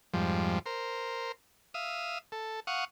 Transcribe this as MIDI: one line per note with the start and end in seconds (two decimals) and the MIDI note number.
0.14 0.59 41
0.14 0.59 44
0.14 0.59 53
0.14 0.59 55
0.66 1.32 70
0.66 1.32 72
1.74 2.18 76
1.74 2.18 77
1.74 2.18 87
2.32 2.60 69
2.67 2.85 77
2.67 2.85 78
2.67 2.85 85
2.67 2.85 87